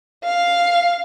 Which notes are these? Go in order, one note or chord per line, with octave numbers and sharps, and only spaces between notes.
F5